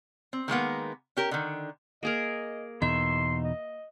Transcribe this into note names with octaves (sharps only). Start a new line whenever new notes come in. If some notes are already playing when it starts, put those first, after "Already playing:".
C4
D#3 G#3 A#3 B3
C#4 G4 A#4
D3 D#3
A#3 G#4 A#4 D#5
E2 B2 D#4 E5 C6
D#5